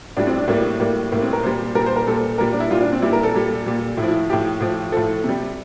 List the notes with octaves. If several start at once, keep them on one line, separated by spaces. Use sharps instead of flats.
A2 G3 D4
C4
D4
A2 G3 A#3
A2 G3 A#3
A2 G3 A#3
C4
A#4
A#2 G3 C5
A#2 G3 A#4
C5
A#4
A#2 G3 A4
A#2 G3 A#4
D4
E4
A#2 G3 F4
D4
C4
A#2 G3 E4
A#4
A4
A#2 G3
A#2 G3
A2 F3 E4
E4
A2 F3 G4
A2 F3
A2 F3 A4
C3
G3